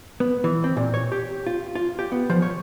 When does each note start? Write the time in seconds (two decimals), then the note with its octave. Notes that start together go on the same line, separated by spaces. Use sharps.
0.20 B3
0.44 E3
0.64 C4
0.77 A#2
0.94 C#5
1.12 G4
1.47 F4
1.75 F4
1.99 G4
2.12 B3
2.30 F3
2.42 C#5